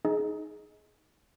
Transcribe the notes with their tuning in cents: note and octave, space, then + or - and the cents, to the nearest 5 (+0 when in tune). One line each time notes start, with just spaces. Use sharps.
D#4 +0 G#4 +20 D#5 +15